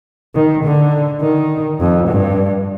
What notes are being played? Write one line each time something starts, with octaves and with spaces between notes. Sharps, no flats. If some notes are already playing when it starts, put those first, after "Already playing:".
D#3
D3
D#3
F2
G2